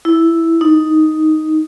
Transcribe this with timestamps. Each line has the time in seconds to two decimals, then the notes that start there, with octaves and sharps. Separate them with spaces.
0.05 E4
0.61 D#4